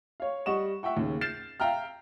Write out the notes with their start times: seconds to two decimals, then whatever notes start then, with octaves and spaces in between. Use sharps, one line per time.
0.20 C#5 F5
0.46 G3 D#5 F#5 C#6 E7
0.83 E5 F#5 G5 C#6
0.97 D#2 C#3
1.21 F6 G6 A6 C7 E7
1.60 E5 F5 G5 A#5 F6